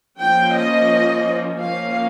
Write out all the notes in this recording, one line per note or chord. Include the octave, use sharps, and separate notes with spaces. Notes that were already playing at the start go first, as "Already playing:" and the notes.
F3 A#3 C#4 G5
D#5
F3 A#3 C#4 F5